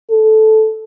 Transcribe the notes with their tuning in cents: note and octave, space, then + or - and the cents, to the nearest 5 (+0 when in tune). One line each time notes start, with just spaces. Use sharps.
A4 -10